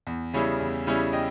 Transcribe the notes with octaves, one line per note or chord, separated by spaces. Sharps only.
E2
C#3 G3 C#4 E4
E2
C#3 G3 C#4 E4
D#5 G5